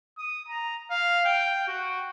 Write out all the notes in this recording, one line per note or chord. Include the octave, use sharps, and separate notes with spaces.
D#6
A#5
F5
G5
F#4